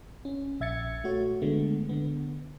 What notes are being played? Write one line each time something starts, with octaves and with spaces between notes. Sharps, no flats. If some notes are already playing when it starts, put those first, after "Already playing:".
C#4
A#1 E5 G#6 A6 C#7
A3 F#4 C#5
D3 G#3 A3 B3
D3 B3